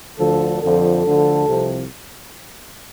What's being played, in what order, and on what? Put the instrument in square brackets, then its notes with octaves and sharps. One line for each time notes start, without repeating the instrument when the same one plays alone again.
[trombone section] D2 D3 F3 A4
F2 D3 F3 A4
D2 D3 F3
C2 C3 F3